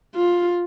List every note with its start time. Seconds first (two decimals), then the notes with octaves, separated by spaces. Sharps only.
0.15 F4